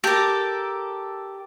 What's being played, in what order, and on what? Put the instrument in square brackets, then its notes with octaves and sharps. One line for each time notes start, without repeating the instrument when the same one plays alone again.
[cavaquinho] G4 [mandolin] A4 A#4